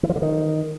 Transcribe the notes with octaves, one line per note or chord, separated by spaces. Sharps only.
E3
F3
D3
D#3